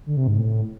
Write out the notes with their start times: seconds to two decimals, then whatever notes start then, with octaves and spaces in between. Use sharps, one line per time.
0.06 D3
0.17 C3
0.27 G#2
0.38 A2